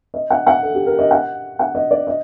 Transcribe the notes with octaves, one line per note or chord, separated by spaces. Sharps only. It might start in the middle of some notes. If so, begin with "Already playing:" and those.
D#5
F#5
F#5
A4
G4
A#4
D#5
F#5
F#5
D#5
D5
D#5